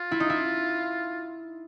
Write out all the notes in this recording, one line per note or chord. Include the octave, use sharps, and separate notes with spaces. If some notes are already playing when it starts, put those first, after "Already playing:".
Already playing: F4
E4
D#4
E4